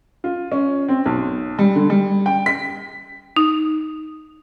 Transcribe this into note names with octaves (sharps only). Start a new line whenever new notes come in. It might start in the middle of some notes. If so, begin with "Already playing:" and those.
F4
C#4
C4
B1
G3
D3
G3
G5
B6
D#4